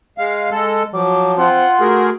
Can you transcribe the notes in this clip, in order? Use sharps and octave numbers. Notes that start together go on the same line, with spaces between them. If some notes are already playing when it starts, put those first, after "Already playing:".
G#3 F5
G#3 A4
F3 F#3 D6
C4 F4 F#5 C6
A3 F#4 G#4 A#4